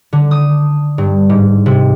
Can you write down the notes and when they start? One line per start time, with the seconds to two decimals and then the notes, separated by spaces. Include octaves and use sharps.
0.13 D3
0.31 D#6
0.98 G2
1.29 G#2
1.66 C3